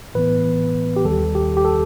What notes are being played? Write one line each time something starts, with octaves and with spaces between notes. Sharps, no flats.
A2 E3 B3 B4
G4
D#2 D#3 G3 A4
G4
G4
A4